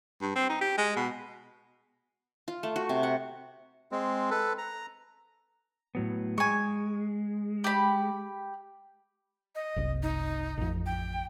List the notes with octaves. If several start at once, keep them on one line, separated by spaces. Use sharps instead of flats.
G2
C4
D#4
G4
G#3
B2
F4
A3
F#4
C3
F#5
G#3 C4
A4 B4
A#5
A2 F#3 B3
G#3 G#5 C#6
G4 B5
D#5
F#1 C2
D#4
A1 F2
G5